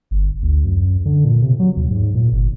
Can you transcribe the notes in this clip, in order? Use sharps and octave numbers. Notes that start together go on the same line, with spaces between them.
G1
D2
F#2
D3
A#2
C3
F#3
D#2
G#2
A#2
G1